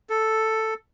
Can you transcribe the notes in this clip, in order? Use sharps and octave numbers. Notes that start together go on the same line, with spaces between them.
A4